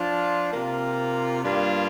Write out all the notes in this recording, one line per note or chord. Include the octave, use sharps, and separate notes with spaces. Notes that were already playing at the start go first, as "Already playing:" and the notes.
Already playing: F3 D4 F4
C3 A#3 F4
G2 G3 A#3 D4 F4